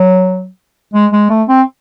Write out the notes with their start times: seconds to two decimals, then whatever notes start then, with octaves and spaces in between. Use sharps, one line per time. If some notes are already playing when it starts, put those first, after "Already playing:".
Already playing: F#3
0.93 G#3
1.13 G#3
1.30 A3
1.49 C4